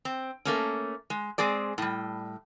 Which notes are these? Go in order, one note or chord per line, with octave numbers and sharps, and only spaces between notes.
C4
A3 A#3 C#4
G#3
G#3 C4 G#4 D5
A2 G3